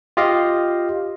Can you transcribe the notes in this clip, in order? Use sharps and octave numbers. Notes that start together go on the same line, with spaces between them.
F4 G4 D#5 F5